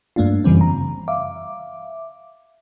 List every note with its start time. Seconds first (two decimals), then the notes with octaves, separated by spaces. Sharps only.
0.16 G2 A3 A#3 D4 F4
0.44 F#2 C#3 E3 G3 C4
0.61 A#5
1.08 E5 F5 D6